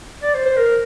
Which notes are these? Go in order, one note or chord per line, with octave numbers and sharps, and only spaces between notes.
D5
C5
C5
A#4